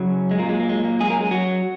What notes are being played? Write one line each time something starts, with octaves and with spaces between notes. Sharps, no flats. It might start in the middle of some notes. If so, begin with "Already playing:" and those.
Already playing: F#2 C#3 F#3
G#3
A#2 F#3 A#3
G#3
A#3
G#3
A#3
F#2 F#3 G#3 G#4
A#3 A#4
G#3 G#4
F#3 F#4